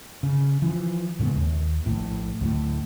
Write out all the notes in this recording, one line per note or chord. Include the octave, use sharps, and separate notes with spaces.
C#3
E3 F3
A2 C#3 G#3 B3
D#2
A#1 A2
D2 A2